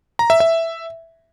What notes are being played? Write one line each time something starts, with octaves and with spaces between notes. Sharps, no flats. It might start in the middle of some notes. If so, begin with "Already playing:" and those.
A#5
E5
E5